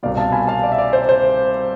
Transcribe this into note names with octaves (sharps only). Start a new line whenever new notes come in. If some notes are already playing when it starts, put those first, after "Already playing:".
C2 B2 B3 D5 F5
F5 A5
G#5 B5
F5 A5
D5
E5
D5
C5
C5